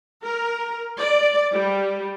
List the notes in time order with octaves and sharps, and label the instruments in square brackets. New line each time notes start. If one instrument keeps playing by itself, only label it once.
[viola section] A#4
D5
G3